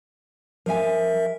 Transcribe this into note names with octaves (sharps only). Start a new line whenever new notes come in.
F3 A#4 E5 F5 G#5